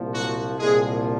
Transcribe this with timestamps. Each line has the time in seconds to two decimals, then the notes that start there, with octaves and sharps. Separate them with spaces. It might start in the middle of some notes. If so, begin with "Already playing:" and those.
Already playing: C2 A#2 F3
0.14 F#3 F#4
0.59 C2 A#2 F3 G#3 G#4